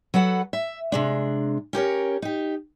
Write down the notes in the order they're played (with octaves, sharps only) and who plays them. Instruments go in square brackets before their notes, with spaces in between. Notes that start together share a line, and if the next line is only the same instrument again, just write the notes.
[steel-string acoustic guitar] F#3 A4 B4 F#5
E5
C3 G#3 D4
C#4 G4 A#4 C#5
D#4 G4